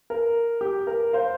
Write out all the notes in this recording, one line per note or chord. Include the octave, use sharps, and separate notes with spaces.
A#4
G4
A#4
C5 F5